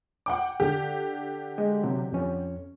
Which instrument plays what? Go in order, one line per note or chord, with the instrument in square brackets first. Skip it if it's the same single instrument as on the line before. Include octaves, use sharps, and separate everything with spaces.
[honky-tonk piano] F#5 G5 D6
D3 G4
[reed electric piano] G#3
C3 F#3
F2 C#4